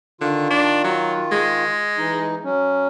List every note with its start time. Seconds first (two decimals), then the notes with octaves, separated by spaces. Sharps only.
0.21 D3 D#3 F4
0.50 D4
0.84 F#3
1.31 G#3
1.98 E3 D#4
2.44 F#3 C#4